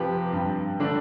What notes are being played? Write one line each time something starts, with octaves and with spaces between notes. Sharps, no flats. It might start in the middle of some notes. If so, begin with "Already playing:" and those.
Already playing: C3 F3 C4 G4 B4
G2
D3 A3 D4